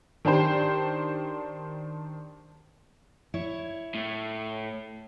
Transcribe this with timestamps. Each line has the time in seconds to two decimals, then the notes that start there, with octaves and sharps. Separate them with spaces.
0.25 D#3 D4 G4 C5
3.34 E4 C#5
3.95 A2